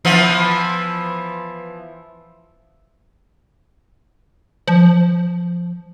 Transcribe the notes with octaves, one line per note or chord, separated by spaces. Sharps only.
E3 F3 B3
F3